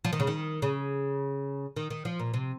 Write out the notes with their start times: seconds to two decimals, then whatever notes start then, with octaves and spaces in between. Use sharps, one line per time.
0.04 F3
0.13 D#3
0.20 C#3
0.27 D#3
0.62 C#3
1.76 D#3
1.90 D#3
2.05 F3
2.19 A#2
2.34 C3